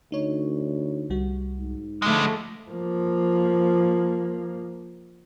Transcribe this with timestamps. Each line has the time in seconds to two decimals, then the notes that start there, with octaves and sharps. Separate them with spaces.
0.12 D2 D#4 C#5
1.10 C2 G3 F#4
1.59 G#2
2.02 D3 F3 G#3 A3 A#6
2.71 F3 A#3